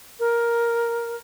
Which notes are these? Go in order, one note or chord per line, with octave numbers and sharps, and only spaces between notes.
A#4